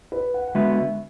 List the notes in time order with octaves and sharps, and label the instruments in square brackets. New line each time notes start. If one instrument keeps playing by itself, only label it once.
[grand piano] B4
F#5
F#5
[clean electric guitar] D3 G#3 B3 F#4 B4 [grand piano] E5
[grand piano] E5